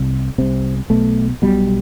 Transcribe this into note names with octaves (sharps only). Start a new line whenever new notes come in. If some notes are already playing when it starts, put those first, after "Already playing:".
Already playing: C2 C3
C2 C3 C4
B1 B2 A3
B1 B2 G3